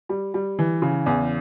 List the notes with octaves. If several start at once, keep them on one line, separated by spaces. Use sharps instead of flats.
G3
G3
E3
C#3
E2